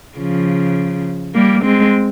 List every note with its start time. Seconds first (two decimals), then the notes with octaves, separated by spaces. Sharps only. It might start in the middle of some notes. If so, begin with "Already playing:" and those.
0.18 C#3 F3
1.35 G3 A#3
1.64 G#3 C4